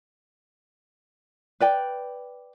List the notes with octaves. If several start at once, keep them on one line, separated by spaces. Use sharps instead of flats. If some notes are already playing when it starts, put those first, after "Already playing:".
B4 D5 G5